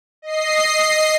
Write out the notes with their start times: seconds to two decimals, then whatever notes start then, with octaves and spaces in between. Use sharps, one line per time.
0.22 D#5 C7